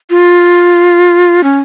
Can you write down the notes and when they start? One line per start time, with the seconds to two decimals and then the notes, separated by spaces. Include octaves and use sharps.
0.10 F4
1.44 C#4